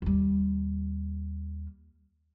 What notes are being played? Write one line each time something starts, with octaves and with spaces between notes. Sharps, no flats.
D#2 G3